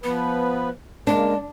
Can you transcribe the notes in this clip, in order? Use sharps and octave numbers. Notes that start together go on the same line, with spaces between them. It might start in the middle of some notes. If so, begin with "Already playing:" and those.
F3 B3 B4
C#3 G#3 A#3 D4